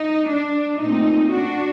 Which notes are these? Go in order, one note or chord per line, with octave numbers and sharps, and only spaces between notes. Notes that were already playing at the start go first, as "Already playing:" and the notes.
Already playing: D#4
D4
A#2 A3 C4 D#4
D4 F#4